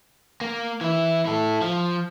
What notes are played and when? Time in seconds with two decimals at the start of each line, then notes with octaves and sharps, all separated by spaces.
0.41 A#3
0.81 E3 E4
1.25 E4 A4
1.62 F3